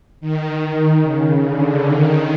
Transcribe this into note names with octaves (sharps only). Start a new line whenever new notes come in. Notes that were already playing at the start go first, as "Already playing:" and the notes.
D#3
C#3
D3
D#3